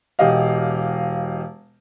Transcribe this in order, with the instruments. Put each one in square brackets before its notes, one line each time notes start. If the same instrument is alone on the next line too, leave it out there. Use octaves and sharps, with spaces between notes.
[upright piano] E1 G4 D#5 F5